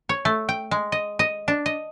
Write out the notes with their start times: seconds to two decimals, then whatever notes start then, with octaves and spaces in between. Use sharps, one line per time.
0.09 C#5
0.25 A3
0.49 G5
0.71 G#3
0.92 D#5
1.19 D#5
1.48 D4
1.66 D#5